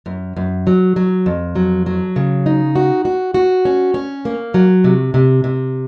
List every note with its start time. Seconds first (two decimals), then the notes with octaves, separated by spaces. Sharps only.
0.06 F#2
0.37 F#2
0.67 F#3
0.96 F#3
1.26 F2
1.56 F#3
1.86 F#3
2.16 C#3
2.46 D#4
2.76 F#4
3.05 F#4
3.34 F#4
3.65 C#4
3.94 C#4
4.25 A#3
4.54 F#3
4.84 C3
5.14 C3
5.44 C3